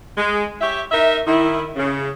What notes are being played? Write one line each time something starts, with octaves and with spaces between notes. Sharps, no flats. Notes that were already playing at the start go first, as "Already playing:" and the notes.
G#3
G4 C#5 E5
D#4 A#4 E5
D#3 E4
C#3